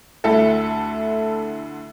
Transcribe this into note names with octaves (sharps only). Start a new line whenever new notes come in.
D2 D3 A3 E4 A4